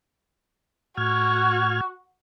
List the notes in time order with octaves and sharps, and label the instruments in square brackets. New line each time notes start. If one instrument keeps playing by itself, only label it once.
[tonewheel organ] A2 F6 G#6 [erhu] F#4